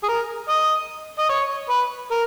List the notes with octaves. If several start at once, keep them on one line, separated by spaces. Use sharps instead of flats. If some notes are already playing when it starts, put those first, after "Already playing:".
G#4
A#4
D#5
D#5
C#5
B4
A#4